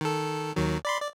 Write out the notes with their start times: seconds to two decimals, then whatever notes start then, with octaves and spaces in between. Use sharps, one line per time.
0.01 D#3 A4
0.56 D#2 D#3 F#3
0.85 D5 B5 C6
1.01 D5